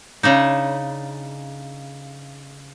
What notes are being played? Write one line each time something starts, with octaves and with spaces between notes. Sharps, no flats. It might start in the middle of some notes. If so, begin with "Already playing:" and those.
C#3 D4 D#4